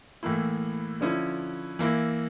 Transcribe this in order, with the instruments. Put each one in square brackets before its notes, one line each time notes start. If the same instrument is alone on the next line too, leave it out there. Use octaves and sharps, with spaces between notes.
[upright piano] A2 E3 A#3 E4
D3 F3 C#4 E4
E3 A#3 E4